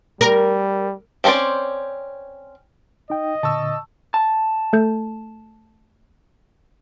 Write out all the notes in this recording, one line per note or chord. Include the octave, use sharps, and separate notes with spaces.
G3 A#4
C4 C#4 A#4 C5 D5
D#4 D#5 G5
A#2 D3 A5 C#6 E6
A5
A3 A4 G6